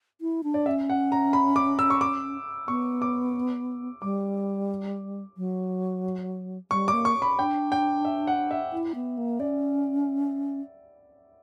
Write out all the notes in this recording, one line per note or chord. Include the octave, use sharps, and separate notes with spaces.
E4
D4
D5
C#4 E5
F#5
A#5
B5
D6
E6
C#6
D6
B3 C#6
D6
G3 D6
F#3
G3 C#6
D6
A#3
C#6
B5
D4 G5
G5
E5
F#5
E5
E4
B3
A#3
C#4 D5